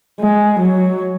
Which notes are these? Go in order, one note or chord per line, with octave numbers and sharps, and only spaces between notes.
G#3
F#3